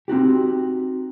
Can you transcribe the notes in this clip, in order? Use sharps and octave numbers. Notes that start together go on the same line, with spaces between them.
C4 D#4 F#4 G4